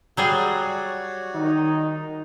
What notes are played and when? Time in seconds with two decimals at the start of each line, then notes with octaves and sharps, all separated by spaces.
0.17 F#3 G3 F#4 G#4 C#5 D5
1.35 D#3 D#4